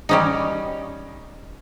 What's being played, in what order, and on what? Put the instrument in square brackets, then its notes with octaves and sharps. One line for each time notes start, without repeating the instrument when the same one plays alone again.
[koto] G3 C#4 D#4